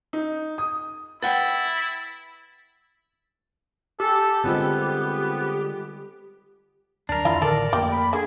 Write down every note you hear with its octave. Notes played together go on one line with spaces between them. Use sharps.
D#4
D#6
E4 B4 F#5 G5 A6
G4 A4 G#5 F6
D3 G3 G#3 B3 C4 F4 C5
D2 F#3 D4 A#4
F2 E3 E4 F4
A1 D3 D#3 A4 A#4 D5
F2 A3 A#3 G4
B5
D3 G#4